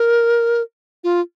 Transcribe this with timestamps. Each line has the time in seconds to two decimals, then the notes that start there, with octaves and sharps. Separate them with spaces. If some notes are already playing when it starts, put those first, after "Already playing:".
Already playing: A#4
1.04 F4